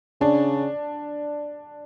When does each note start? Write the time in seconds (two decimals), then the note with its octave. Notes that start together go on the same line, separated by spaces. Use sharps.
0.20 C#3 D4